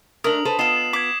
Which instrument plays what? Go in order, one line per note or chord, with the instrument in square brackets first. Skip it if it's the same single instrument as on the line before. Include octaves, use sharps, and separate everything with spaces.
[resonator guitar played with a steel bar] A3 D4 [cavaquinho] A#4 [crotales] D#6 F#7
[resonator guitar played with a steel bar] A4 B4 C5
[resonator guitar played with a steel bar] B3 F4 [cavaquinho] A4 D#5 [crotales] C7 E7
[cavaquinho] D6 [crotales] G#6 B6